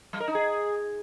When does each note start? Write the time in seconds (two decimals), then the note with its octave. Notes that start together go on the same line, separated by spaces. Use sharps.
0.13 G3
0.20 A#4
0.28 D#4
0.35 G#4